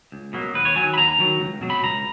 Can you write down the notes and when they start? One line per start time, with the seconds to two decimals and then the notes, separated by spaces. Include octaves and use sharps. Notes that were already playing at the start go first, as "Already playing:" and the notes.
0.12 C#2
0.33 B2 F#3 A#3
0.54 D#2 B4
0.65 C#5
0.76 D#3 F#3 G#5
0.94 B5
0.98 D#2 A#5
1.19 D#3 F#3
1.40 C#2
1.61 B2 F#3
1.70 B5
1.83 C#2 A#5